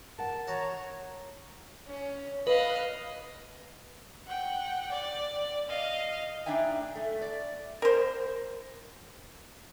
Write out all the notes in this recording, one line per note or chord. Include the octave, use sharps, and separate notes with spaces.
A#4 F#5 A5
F#4 C#5 A5 A#5
C#4
B4 D#5 F5
F#5 G5
D5
D#5 F5
A2 D4 D#4 E5 G5 G#5
A3
D5
A#4 C5